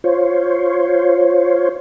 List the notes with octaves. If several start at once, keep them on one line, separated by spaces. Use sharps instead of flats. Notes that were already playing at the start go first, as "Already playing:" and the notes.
F4 C5 C#5